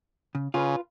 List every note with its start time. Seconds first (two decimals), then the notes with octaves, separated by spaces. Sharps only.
0.35 C#3
0.54 C#3 F4 B4